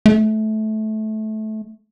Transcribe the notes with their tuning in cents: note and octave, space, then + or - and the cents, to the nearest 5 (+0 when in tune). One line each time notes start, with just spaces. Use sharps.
A3 -20